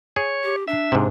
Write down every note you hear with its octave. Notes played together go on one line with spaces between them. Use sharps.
G#4 C#5
G4
D4 E5
G#2 C3